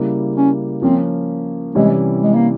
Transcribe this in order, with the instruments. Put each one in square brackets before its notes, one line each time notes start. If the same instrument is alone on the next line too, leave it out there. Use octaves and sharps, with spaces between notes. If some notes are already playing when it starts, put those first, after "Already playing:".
Already playing: [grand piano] C#3 G3 A#3 E4
[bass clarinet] C#4
[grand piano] F3 A#3 C#4 [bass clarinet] C4
[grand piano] C3 E3 G3 C#4 E4 [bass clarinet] G#3
[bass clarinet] G#3
A#3